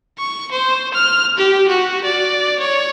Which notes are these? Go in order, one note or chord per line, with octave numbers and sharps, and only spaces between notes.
C#6
C5
F6
G4
F#4
D5
C#5